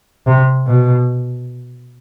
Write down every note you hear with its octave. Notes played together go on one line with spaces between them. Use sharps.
C3
B2